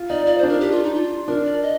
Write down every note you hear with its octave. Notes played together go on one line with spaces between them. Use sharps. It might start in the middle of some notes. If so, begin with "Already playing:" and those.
Already playing: F4
D#4 D5
F4 D5
C5
D4
A#4
G4
F4
D#4
F4
D4 A#4
D5
D#5